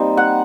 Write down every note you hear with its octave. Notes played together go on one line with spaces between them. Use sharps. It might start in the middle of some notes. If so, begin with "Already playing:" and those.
Already playing: G3 A#3 C4 D#4
F#5